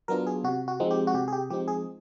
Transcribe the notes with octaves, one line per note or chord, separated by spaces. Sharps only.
F#3 B3 D4 F4 A#4
G#4
C3 F#4
F#4
F3 G#3 C4 D#4
G4
F#4
C3 G4
G#4
G4
F3 G#3 C4 D#4 G4
G#4